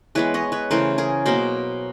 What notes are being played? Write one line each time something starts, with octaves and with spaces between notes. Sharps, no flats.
E3 G#3 B3 B4 C#5
C#5 D#5
B4 C#5
C#3 E3 A3 A#4 C5
G#4 A#4
B2 F#3 A#3 A#4 C5